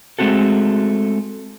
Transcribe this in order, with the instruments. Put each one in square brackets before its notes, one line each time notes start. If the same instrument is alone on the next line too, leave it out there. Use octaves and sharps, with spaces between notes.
[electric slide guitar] G#3 A3 C4 F#4 A4